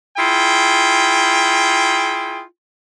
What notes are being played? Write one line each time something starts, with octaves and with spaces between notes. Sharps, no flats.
E4 F4 G#4 G5